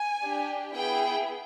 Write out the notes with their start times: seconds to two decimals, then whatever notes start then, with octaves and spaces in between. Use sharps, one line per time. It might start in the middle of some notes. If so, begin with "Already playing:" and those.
Already playing: G#5
0.23 D4 G4
0.74 B3 E4 G#4 G5